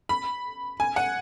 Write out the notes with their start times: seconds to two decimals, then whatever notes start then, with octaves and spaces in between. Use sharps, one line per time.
0.09 B5
0.80 G#5
0.96 F#5